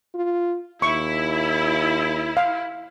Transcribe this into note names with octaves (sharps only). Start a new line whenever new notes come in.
F4
D#2 E4 C#6
F5